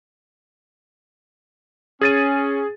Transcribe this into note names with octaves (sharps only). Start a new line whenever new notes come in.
C#4 G#4 A6 D#7